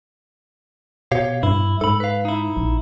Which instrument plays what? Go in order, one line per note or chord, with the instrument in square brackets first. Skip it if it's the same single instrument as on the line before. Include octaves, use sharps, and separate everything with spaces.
[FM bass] B2 [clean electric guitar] G4 C#5 F5
[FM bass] G2 [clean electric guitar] E4
[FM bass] G#2 [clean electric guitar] A4 B5
[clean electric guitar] B4 F5
D#4 E4
[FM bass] A#1